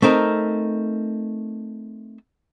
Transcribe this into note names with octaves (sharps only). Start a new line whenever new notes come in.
A3 C4 D#4 A#4